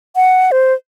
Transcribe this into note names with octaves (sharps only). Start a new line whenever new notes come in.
F#5
C5